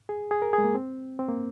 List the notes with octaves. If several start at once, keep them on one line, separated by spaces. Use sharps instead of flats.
G#4
G#4
A#4
G#4
G#3
A#3
C4
C4
A#3